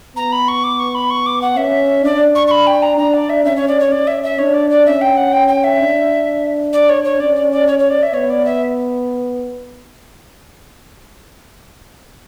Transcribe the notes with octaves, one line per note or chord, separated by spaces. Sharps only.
B3 A#5
B5
C#6
D6
C#6
B5
C#6
D6
F#5
C#4 E5
D4 D5
C#6
C#6
B5
G5
A#5
D4 A#5
D5
E5
C#4 E5
C#5
D5
C#5
C#4 D5
E5
E5
D4 C#5
D5
D5
C#4 E5
G5
F#5
G5
G5
E5
D4
D5
C#5
C#5
C#4 D5
D5
D5
C#5
C#5
D5
E5
B3 C#5
D5
E5